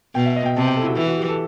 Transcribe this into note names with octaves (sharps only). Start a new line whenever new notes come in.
B2 G5
E5
D#5
G5
C3 A5
G5
A4
E4
F#4
E3 E4
F#4
G4
A4